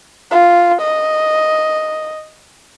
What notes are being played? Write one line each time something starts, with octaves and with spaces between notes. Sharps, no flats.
F4
D#5